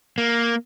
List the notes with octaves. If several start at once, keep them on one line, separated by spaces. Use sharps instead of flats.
A#3